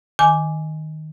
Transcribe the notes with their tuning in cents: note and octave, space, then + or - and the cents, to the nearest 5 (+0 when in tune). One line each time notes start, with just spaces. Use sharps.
D#3 +0 G#5 +0 D6 -10